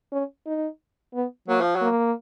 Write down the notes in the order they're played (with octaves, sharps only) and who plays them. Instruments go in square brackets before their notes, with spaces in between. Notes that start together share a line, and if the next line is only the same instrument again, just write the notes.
[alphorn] C#4
D#4
B3
[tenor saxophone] F#3 [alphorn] A#3
[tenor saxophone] F3
F#3
[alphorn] A#3